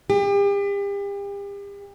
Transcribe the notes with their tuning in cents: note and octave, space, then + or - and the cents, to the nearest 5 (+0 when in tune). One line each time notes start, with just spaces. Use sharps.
G4 +40